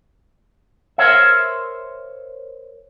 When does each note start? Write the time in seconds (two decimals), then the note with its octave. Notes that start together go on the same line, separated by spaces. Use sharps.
0.98 A#4 C5 C#5 E5